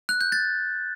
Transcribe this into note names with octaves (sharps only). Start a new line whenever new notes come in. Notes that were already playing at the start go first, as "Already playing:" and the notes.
F#6
G6
A6